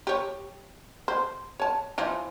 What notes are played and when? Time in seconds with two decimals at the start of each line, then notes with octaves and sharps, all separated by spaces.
0.07 G4 C#5
1.08 C5
1.60 C#5 A5
1.98 E3 F3